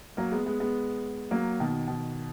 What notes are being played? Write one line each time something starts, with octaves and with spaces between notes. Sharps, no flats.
F#3 A#3
G#3 B3
G#3 B3
G#3 B3
F#3 A#3
B2 D#3
B2 D#3